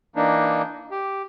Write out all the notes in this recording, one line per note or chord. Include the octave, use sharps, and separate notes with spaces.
E3 A#3 D4 D#4
G4